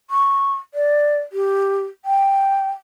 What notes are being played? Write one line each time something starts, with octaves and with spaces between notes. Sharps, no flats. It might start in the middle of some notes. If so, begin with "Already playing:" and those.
C#6
D5
G4
G5